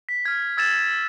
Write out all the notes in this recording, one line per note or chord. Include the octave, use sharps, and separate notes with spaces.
B6
F6 G#6
E6 G#6 A6 E7